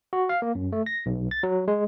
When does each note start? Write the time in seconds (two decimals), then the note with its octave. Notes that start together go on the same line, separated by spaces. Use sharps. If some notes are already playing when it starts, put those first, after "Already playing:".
0.13 F#4
0.29 F5
0.42 A#3
0.55 F#2
0.72 A3
0.86 A#6
1.06 B1
1.31 A6
1.43 F#3
1.68 G#3